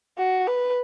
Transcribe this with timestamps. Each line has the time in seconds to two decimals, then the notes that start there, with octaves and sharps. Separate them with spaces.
0.18 F#4
0.47 B4